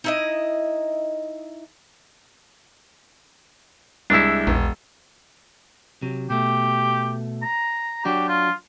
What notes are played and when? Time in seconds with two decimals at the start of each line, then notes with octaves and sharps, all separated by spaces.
0.04 D#4 E4 D#5
4.10 C2 G#3 D4 E4 E6
4.47 E1 A#1
6.02 C3 F#3
6.30 B2 A3 G4
7.42 A#5
8.05 F#3 D4 F#4 G4
8.28 F4